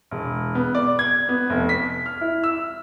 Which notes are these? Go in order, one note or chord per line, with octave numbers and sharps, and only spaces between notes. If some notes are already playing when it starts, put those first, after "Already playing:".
E1
B3
D5
G#6
B3
F1
B6
F6
E4
E6